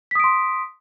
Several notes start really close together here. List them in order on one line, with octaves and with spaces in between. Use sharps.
B6 D#6 D7 C6